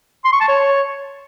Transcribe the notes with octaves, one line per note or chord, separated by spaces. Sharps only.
C6
C#6
A5
C#5